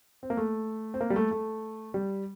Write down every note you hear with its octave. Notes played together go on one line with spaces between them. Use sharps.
C4
A#3
A3
C4
A#3
G3
A3
A3
G3